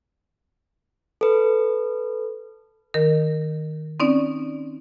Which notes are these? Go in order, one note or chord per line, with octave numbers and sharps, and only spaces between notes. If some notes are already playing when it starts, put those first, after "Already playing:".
A4 B4
D#3 A#4
C4 C#4 D#4 D5